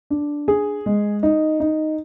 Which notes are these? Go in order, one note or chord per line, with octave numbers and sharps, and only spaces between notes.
D4
G#4
G#3
D#4
D#4